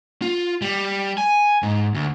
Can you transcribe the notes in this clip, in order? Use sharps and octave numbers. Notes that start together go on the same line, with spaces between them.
F4
G3
G#5
G#2
D2